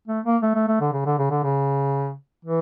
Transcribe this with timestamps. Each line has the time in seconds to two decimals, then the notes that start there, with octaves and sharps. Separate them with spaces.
0.08 A3
0.25 A#3
0.42 A3
0.55 A3
0.68 A3
0.81 D3
0.93 C#3
1.06 D3
1.18 C#3
1.31 D3
1.43 C#3
2.45 E3